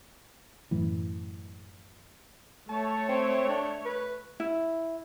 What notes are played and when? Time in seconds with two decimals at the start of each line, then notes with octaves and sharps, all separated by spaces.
0.71 F#2 A2 E3
2.69 A3 C#5 A5
3.09 C4
3.49 D4
3.85 B4
4.40 E4